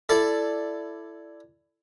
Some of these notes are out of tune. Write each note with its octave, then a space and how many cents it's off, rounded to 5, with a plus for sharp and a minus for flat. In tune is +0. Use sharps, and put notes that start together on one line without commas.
E4 +15 A4 +0 D5 +0